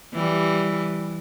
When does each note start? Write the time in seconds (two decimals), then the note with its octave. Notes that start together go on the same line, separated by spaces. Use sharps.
0.14 E3 G3